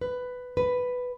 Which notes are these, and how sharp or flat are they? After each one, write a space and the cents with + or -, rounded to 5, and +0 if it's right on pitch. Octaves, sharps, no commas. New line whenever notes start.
B4 +10
B4 +5